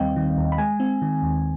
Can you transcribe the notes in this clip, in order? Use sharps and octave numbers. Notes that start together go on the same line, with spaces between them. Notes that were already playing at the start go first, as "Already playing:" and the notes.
Already playing: D#2 D#3 G3 C4 D#5 F5 G5
D#3
D#2
B5
G#3 G#5
C4
D#3
D#2